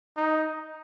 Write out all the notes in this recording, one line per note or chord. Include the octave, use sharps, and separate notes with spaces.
D#4